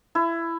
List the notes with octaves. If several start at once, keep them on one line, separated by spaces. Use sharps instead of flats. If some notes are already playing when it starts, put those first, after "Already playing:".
E4